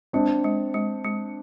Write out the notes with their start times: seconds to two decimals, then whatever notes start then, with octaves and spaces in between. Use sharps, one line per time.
0.13 G#3 C4 D4
0.44 G#3
0.74 G#3
1.04 G#3